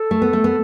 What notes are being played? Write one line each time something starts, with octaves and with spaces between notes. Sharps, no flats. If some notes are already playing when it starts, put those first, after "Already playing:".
Already playing: A4
A3
B3
A3
B3